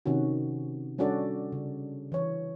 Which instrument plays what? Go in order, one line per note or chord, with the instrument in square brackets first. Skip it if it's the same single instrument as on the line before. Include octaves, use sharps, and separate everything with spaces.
[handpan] C3 D#3 C#4 F#4
G3 C#4 D4 F#4 A4 D5
C#3
E3 C#5